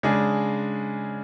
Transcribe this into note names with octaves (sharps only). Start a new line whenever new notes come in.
C#3 G#3 D4 G#4